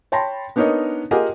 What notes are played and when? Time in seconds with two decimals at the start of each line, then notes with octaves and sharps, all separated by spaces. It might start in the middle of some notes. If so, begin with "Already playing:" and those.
0.12 C#5 G5 A5 B5 C6 A#6
0.56 B3 D4 D#4 A#4 C#5 D#5
1.11 F4 G4 G#4 A#4 D#5 F#5